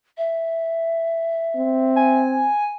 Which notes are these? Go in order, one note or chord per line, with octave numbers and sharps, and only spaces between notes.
E5
C4
G#5